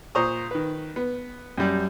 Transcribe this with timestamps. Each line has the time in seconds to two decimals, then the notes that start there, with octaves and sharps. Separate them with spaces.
0.15 A#2 C5 A#5 C#6 D#6
0.51 D#3 B4
0.96 B3
1.58 F#2 G3